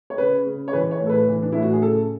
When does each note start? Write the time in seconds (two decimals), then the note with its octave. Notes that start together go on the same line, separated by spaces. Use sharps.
0.10 C#5
0.18 C#3 B4
0.47 C#3
0.68 C#5
0.73 E3 B4
0.91 C#5
1.00 A2
1.06 A4
1.10 B4
1.28 E3
1.42 D4
1.52 A2 E4
1.63 F#4
1.73 G#4
1.82 C#3 A4